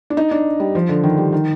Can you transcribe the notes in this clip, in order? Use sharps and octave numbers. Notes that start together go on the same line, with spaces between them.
D4
D#4
D4
G3
F3
D3
D#3
G3
D#3